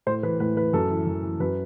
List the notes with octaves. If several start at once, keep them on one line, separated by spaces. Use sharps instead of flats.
A2 C5
E3 B4
A2 B4
E3 B4
F#2 A4
E3
F#2
E3
F#2 B4